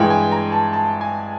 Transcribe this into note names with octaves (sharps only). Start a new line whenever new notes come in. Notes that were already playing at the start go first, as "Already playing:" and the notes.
Already playing: G2 E3 G#3 G5
G#5
A#5
A5
A5
G#5